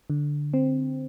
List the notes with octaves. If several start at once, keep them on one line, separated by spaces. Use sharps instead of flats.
D3
C4